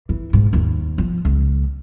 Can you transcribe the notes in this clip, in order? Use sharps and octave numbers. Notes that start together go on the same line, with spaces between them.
E3
G#2
D#2
F3
C#2